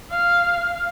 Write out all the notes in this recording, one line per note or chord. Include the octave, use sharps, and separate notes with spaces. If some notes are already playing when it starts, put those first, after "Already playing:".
F5